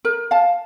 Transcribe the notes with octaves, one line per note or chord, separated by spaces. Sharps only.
A#4
F5 A5